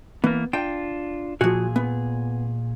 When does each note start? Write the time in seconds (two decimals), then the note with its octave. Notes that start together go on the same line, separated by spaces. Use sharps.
0.24 E3 A#3 B3
0.53 D4 F4 G5
1.41 A#2 F3 F#4 G#4
1.76 B3